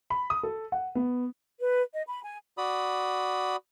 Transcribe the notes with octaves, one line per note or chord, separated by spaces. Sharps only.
B5
D#6
A4
F#5
B3
B4
D#5
B5
G#5
F#4 D5 B5 D#6